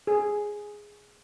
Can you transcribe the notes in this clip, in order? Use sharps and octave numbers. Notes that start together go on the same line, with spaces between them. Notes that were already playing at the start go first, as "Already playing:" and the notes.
G#4